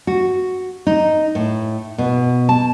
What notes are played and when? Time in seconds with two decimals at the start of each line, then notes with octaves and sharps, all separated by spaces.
0.07 F#4
0.87 D#4
1.35 A2
1.98 B2
2.49 A5